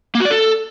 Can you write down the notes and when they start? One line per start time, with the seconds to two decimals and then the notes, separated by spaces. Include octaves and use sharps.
0.15 A#3
0.20 F#4
0.25 D5
0.30 A4